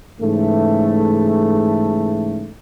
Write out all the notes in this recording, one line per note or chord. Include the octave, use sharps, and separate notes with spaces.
G#2 C#3 E3 A3